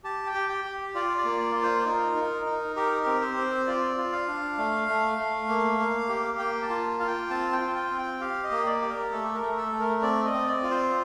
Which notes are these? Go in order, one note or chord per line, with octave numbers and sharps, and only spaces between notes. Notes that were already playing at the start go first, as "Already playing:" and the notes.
G4 A5
G5
G4
G5
G4
F4 D5
D5
A#3
D5
F4
C5
C5
D#4 A#4
D#4
D#4
G4 A#4
C4
C5
C4
F4 D5
F4
F5
D4
A3
A3
A3
A#3
A#3
G4
A#3 G5
A5
F4
F4 F5
G5
C4 A5
G5
F4
G5
C4
G5
G4 F5
D#5
A#3
D5
G4
A#4
A3 A4
A#4
A3
A4
A3
A#4
C4 D5
D#5
C4
D5
F4
C5